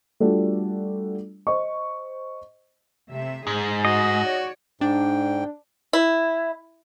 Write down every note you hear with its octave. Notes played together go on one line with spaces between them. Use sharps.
G3 A3 D4 F4 F#4
C5 D#5 C#6
C3 A3 E5
G#2 D#4 G#4 C5
F#4 D#5
C#5 D5
G#2 D4 G5
E4